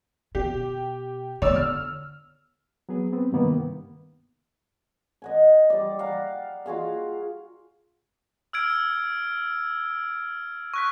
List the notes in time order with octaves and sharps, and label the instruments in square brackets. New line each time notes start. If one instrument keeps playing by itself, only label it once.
[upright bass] B2 [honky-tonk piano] G4
[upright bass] D3 B3 [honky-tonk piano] C#5 D5 E6
[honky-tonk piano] F6
[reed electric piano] F#3 B3 G#4
B3 C4
G2 C3 D#3 A#3 B3
[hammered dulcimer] D#5 F#5 G#5
G3 D5
F5 F#5 A#5
F4 F#4 G#4 F5
[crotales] E6 F6 G#6 D7
C#6 F#6 B6